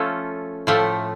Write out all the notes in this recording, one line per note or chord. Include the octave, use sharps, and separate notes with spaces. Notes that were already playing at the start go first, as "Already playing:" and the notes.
Already playing: F3 A3 C#4 F4 A4
A2 F3 A3